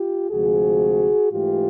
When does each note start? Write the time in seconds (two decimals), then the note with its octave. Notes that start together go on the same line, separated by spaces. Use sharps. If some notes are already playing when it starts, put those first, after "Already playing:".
Already playing: F4 G4
0.31 D2 C3 F3 G#3 F#4 G#4
1.32 G#2 E3 A3 F4 G4